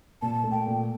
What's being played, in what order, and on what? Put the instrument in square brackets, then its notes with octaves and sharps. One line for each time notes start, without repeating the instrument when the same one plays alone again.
[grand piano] A#2 [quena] A5
[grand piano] A3
[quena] G5
[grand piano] A#2